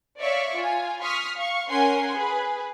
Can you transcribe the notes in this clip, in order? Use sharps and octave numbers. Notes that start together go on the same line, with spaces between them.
C#5 D5 E5 F5 C#6
F4 G#5
C6 C#6 D#6 F6 B6
F5 C#6
C#4 A#4 F#5 G#5 C6
G#4 B4